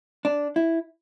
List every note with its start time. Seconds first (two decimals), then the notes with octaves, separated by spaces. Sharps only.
0.25 D4
0.56 E4